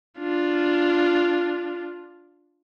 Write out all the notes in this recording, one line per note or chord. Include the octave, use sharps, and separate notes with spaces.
D4 F4